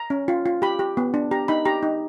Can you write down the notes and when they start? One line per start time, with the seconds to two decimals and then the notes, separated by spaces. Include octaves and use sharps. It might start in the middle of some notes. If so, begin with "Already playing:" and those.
Already playing: A#5
0.10 C#4
0.28 F4
0.46 F4
0.62 G4 B5
0.79 G4
0.97 B3
1.14 D4
1.31 G4 A#5
1.48 D#4 B5
1.65 G4 A#5
1.83 D#4